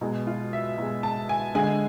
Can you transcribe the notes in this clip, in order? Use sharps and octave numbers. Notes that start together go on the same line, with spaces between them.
B2 G#3
F4
E5
B2 G#3
A5
G#5
D3 G#3 G#5